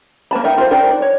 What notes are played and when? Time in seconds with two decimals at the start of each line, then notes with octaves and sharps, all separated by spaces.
0.31 A#3 B4 A5 B5
0.44 D#4 A#4 E5 F#5 G5
0.58 F4 C5
0.71 D4 D#4 A#4 G5
0.91 D5
1.02 C#5